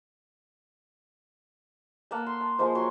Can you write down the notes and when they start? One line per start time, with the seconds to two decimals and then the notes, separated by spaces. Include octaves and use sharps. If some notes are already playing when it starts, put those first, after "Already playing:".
2.11 A#3 F#5 A5
2.27 C6
2.41 A5
2.59 F3 G#3 A#3 C5
2.75 F#3 C#5 C6